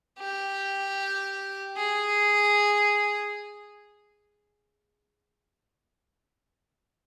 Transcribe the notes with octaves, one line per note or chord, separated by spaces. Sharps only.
G4
G#4